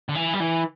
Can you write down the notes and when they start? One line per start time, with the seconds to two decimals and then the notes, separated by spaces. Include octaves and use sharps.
0.09 D3
0.15 E3
0.34 G3
0.40 E3